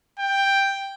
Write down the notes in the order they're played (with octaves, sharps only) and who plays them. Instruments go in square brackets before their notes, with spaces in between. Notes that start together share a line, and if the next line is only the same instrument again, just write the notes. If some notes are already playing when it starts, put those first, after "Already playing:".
[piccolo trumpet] G5